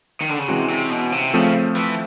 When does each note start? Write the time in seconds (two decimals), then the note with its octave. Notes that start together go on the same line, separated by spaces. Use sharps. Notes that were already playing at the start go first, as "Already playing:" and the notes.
0.21 D#3
0.30 D3
0.39 C#3
0.48 C3 E3 G#3 C#4 F#4
0.69 C3
0.90 B2
1.12 C3
1.34 C#3 F3 A3 C4
1.76 E3